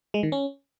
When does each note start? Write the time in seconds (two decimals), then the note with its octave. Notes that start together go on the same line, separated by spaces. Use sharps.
0.14 G#3
0.23 D#3
0.32 C#4